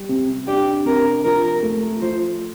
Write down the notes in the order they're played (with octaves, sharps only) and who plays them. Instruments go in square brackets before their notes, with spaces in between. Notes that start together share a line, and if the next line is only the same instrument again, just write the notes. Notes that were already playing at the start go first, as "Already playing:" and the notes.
Already playing: [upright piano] G3
C3
[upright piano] D4 [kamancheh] G4
[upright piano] C3 [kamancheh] A#4
[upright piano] F3 [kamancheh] A#4
[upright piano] A3
[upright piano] F3 [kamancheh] C5